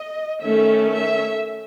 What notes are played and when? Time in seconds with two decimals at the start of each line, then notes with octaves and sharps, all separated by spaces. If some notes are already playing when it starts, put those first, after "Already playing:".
Already playing: D#5
0.42 D#3 A3 C#4 E5
0.90 E5